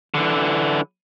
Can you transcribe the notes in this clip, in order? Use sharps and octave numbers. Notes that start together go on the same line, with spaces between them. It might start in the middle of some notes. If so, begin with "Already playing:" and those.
D3 E3